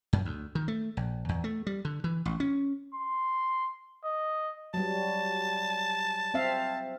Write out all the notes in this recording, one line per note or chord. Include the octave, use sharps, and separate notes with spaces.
F#2
D2
D#3
A3
A#1
E2
A3
G3
D3
E3
A1
C#4
C6
D#5
F#3 G3 A5
C4 E5 F5